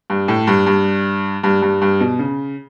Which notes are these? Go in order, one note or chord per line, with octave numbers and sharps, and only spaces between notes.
G2
A2
G2
G2
G2
G2
G2
B2
C#3